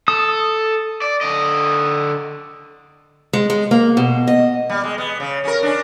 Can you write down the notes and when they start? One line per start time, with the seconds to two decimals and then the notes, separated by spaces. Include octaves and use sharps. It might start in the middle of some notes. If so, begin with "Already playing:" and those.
0.08 A4 D#6
1.02 D5
1.21 D3 D#5
3.33 G#3
3.50 G#3
3.71 A#3
3.97 B2
4.27 D#5
4.69 G3
4.83 G#3
4.98 B3
5.20 C#3
5.44 C#4 A#4
5.63 C#4 D4